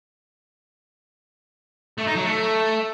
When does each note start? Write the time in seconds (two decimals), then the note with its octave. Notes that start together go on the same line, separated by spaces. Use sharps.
1.98 A3
2.07 D#4
2.16 F#3
2.25 A3